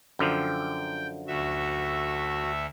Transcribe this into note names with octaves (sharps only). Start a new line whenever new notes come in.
F#2 D3 F3 G5
D2 A3 F#4 E5